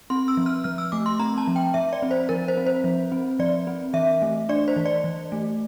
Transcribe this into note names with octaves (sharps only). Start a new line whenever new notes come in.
C4 C6
E6
F3
F6
F3 F6
E6
A3 D6
C6
C4 A#5
A5
F3
G5
F3 E5
D5
C4
C5
F3 A#4
C5
C4
C5
F3
C4
F3 D5
C4
E3 E5
A3
D4 D5
C5
E3
D5
E3
A3